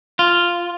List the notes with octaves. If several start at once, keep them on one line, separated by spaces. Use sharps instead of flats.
F4